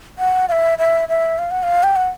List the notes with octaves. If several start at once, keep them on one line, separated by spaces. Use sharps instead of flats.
F#5
F5
E5
E5
E5
F5
F#5
F5
G5
F#5